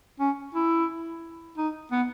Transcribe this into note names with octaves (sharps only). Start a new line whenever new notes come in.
C#4
E4
D#4
B3